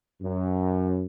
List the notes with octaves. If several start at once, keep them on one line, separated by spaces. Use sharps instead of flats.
F#2